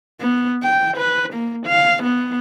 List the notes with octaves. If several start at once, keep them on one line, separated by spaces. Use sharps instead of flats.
B3
G5
B4
A#3
F5
B3